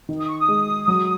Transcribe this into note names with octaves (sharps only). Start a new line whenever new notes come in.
D#3
D#6
C#6
D#6
G#3
F#3